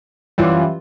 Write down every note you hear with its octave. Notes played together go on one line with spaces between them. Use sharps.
F#2 E3 G3 F4